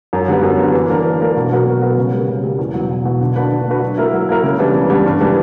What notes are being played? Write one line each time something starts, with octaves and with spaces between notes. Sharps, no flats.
F#2
D3 G3 B3
F#2
D3 G3 B3
E3
A#3 D4 A#4
E3
A#3 D4 A#4
B2
F#3 B3 F#4 A#4
B2
F#3 B3 F#4 A#4
C#3
G3 A#3
C#3
G3 A#3
E2
F#3
B2
E2
B2 F#3
D3
A#3 D4 F#4 B4
D3
A#3 D4 F#4 B4
F#3
A#3 E4 A#4
F#3
A#3 E4 A#4
C#3
E3 G3 B3 D4
C#3
E3 G3 B3 D4
G2
E3 G3 A#3 D4